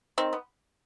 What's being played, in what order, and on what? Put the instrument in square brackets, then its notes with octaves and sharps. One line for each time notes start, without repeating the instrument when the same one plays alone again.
[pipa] D#3 C4
B3